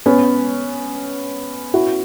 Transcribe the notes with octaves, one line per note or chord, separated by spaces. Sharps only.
B3 C#4
E4 F#4